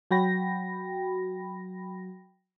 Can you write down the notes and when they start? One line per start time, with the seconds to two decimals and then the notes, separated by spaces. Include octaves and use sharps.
0.11 F#3 F#4 G5 B5 A#6